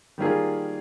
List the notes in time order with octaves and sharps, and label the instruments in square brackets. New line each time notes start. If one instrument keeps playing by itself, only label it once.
[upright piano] D#3 G3 A#3 F4 G#4